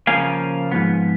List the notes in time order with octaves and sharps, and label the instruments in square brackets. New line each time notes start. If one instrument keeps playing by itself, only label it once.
[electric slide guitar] C#3 F3 A#3 F5 G#5
G#2 F3 B3